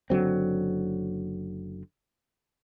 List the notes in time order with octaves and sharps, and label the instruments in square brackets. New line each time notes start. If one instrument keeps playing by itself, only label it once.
[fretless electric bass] F#1 D3 F#3 C4